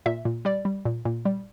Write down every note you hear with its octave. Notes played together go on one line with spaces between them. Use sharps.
A#2 E5
A#2
G3 D5
G3
A#2
A#2
G3